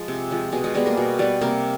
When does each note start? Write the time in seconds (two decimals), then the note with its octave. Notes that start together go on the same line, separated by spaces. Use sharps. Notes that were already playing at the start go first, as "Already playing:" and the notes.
Already playing: F3 G#3
0.08 C3
0.31 F3 G#3
0.52 B2 G#3 G#4
0.64 G#3 G#4
0.75 G3 G#3 B3 G#4
0.86 A#3 A#4
0.97 B2
1.19 G3 B3
1.41 C3 A#3 A#4